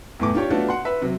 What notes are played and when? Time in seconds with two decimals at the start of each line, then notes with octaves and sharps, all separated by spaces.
0.20 E2 A2 D6
0.34 D4 F4 G4 C#5
0.50 A3 B3 D4 F4 F#4 A4
0.68 F#5 C6
0.85 B4 E5
1.02 C3 F#3